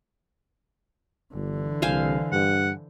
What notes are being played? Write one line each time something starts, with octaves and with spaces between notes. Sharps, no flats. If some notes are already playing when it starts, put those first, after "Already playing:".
G1 D3 E3
C2 C5 F5 G#5
G2 F#5